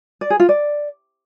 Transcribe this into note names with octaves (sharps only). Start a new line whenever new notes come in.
D5
G#4
F4
D5